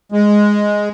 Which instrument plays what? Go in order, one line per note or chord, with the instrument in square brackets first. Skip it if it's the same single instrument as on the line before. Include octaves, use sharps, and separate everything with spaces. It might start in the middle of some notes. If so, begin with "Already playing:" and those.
[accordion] G#3